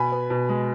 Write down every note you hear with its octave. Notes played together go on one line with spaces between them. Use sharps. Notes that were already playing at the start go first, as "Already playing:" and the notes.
Already playing: B2 G#5 B5
B3
B2
G#3